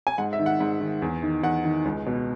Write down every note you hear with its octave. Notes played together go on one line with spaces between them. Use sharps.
G#5
G#2 F#5
E5
D#3
F#5
G#2
D#3
E2
D#3
E2 F#5
D#3
C#2
B2